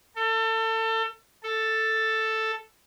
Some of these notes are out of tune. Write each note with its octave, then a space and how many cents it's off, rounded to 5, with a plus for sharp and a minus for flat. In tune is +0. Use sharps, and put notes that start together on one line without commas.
A4 +30
A4 +5